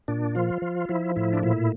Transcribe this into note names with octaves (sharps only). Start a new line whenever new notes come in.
A#2 D4
F3 F4
F3
F3 E4
A2 E4
D4
A#2 E4